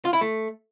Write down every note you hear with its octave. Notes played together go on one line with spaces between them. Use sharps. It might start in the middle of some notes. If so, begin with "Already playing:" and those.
F4
E4
A3